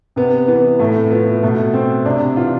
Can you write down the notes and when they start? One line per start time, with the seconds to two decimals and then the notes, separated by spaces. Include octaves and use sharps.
0.16 C3 B3
0.48 E3 B3
0.79 A2 A3
1.11 F3 B3
1.43 B2 A3
1.74 C4
2.05 C3 D4
2.37 E3 F4